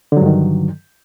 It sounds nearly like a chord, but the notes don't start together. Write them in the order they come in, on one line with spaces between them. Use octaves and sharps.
D3 F#3 G2 D#3